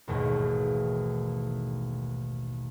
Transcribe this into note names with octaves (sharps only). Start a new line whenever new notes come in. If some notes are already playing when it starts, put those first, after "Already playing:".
A1 D#2 G#2 B2